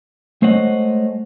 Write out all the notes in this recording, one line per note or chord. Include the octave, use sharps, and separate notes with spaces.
G#3 A3 C5 C#5 D#5 F#5